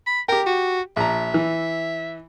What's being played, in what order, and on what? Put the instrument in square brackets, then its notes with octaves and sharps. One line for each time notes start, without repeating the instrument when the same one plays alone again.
[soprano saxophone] B5
[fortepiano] G4 G5 [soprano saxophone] A#4
[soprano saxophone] F#4
[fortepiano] A#1 A#5 [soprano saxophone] E5
[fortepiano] E3